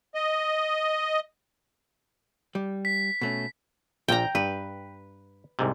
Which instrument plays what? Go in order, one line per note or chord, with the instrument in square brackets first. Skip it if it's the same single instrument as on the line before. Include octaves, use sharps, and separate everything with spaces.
[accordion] D#5
[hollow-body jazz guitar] G3
[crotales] B6
[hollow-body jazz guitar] B2 A3 C#4
[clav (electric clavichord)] A#1 A#2 [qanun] G5 A#5
[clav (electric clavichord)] G2 [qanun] B4
[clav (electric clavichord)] C2 G#2 C3